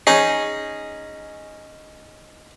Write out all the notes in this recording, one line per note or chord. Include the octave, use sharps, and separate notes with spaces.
C#4 D#4 G#4